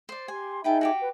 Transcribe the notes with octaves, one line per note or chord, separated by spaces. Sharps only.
C5 D5
G4 G#5 C6
D#4 G#4 B4 E5 G5 A5
F#4 G4 D6
B4